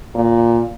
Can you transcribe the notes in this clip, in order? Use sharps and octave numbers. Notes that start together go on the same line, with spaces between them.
A#2